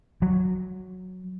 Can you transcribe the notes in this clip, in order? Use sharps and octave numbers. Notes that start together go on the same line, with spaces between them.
F#3